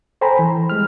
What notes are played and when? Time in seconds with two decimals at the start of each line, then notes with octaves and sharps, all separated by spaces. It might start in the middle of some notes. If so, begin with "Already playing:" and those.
0.21 A4 C5 G5 G#5 A#5 B5
0.39 E3
0.70 G3 G#3 F6